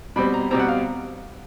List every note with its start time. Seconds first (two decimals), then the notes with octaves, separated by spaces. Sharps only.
0.16 B2 G3 C4 B5
0.34 A#5
0.51 B2 G3 C4 A#5
0.59 F#5
0.68 F5